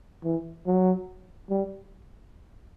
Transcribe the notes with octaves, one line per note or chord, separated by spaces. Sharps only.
E3
F#3
G3